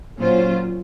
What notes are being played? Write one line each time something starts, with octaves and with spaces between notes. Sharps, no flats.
A#2 F#3 C#4 F4 C5